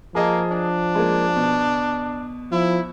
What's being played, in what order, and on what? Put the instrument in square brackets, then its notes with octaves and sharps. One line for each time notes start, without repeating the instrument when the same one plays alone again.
[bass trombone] F3 [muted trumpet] A#3 [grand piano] G#4 D#5 A5
[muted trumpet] D4
[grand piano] G#3 A#3
B2
[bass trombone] F3 [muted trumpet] E4